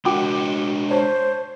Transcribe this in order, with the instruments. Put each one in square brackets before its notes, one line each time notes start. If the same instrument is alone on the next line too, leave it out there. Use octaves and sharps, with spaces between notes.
[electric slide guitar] G#3 D4 A#4 [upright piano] F#4 G5 D6
[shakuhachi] C5 [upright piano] C#5 A5